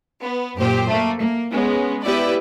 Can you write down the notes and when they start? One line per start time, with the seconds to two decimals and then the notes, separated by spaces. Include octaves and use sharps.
0.22 B3
0.57 F#2 A#2 G4 C5
0.88 A3 A#3
1.19 A#3
1.51 G#3 B3 C#4
2.04 B3 E4 G4 B4 D5 E5